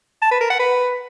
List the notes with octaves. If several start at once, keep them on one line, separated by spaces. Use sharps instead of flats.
A5
B4
A#4
F#5
B4